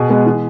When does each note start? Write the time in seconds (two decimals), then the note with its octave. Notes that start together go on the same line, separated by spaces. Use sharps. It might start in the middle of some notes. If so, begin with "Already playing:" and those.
Already playing: B2 G#4
0.09 G#3 B3
0.26 E3